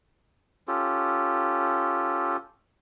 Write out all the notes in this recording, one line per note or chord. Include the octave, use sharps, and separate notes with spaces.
C#4 F4 G4 A4